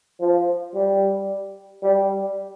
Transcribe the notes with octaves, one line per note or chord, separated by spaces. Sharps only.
F3
G3
G3